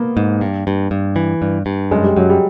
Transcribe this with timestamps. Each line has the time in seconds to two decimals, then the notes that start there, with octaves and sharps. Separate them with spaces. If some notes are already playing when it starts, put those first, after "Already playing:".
Already playing: A#3 B3
0.17 G#2
0.41 G2
0.67 G2
0.91 G2
1.16 E3
1.42 G2
1.66 G2
1.91 F#2 G#3
2.04 G3
2.17 F#2 F#3
2.29 G3